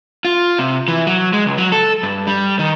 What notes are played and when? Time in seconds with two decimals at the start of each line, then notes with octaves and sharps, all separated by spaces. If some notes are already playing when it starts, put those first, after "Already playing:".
0.25 F4
0.59 C3
0.88 E3
1.07 F#3
1.33 G#3
1.46 C#2
1.58 F#3
1.72 A4
2.03 G2
2.27 G3
2.59 D#3